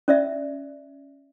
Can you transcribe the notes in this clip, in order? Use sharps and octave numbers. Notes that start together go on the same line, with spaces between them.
C#4 D5 E5